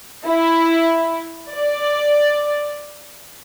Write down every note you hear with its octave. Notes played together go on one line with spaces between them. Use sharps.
E4
D5